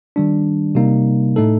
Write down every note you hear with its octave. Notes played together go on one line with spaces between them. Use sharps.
D#3 G3 D4
C3 G3 A#3 D#4
A2 A3 D#4 A4